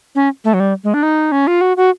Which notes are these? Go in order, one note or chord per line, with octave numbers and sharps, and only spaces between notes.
C#4
A3
F#3
G3
G#3
D4
D#4
C#4
F4
F#4
F#4